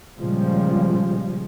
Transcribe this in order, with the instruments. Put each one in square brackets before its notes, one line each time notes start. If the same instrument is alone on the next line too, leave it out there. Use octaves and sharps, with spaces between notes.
[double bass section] A#2 C#3 F3 G3 G#3